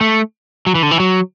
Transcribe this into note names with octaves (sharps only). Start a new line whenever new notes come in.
A3
F#3
E3
D3
E3
F#3